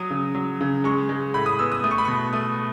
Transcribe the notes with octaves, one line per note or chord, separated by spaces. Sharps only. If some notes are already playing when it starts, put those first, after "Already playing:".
Already playing: F#3 D#6
C#3
F#3
C#3
G#3 C#6
G#3
A2 B5
D#6
B3 E6
D#6
A3 D#6
C#6
B5
B2 C#6
A3 D#6